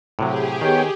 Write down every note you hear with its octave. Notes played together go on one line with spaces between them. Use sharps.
A2 C3 F#3 G4 G#4
D#3 B3 C#5 G5